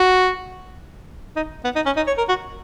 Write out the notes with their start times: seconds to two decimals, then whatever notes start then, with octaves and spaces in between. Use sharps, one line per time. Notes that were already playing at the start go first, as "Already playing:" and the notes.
Already playing: F#4
1.36 D#4
1.64 B3
1.76 D#4
1.86 C#4
1.96 D#4
2.07 C#5
2.18 A#4
2.29 F#4